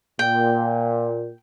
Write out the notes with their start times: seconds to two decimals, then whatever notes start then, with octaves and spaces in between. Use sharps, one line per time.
0.19 A#2 G5